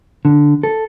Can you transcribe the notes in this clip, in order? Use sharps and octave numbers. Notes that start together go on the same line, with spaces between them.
D3
A4